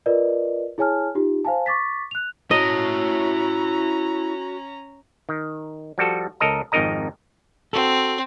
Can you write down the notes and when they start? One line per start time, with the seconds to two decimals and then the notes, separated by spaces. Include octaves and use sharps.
0.06 F4 A#4 B4 D5 D#5
0.78 E4 G#4 C#5 G#5 A5 F6
1.15 D#4 F4 G4
1.45 C5 F5 G#5 A5
1.66 C#6 D6 A6 B6
2.11 F#6 F7
2.51 C#4 E4 F#4 C#5 D#5 A#5
5.29 D#3
5.98 F3 G3 F#4 A4
6.40 C#2 A4 A#4 D#5 A#5
6.72 G#1 F2 D#4 A#4 D#5 A#5
7.73 C4 F#4 A4